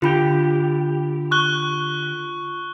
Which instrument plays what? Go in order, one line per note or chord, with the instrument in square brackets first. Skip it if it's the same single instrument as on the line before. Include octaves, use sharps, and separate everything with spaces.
[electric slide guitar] D3 G4 [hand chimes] F4 B5
[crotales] C#6 F#6 G7